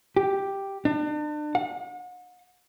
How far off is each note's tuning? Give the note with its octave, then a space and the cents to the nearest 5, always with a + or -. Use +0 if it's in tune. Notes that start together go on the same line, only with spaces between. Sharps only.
G4 +0
D4 +35
F#5 -40